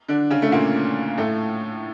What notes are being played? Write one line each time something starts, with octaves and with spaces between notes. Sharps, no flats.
D3 D4
C#3 C#4
A3
A#2 A#3
A2 A3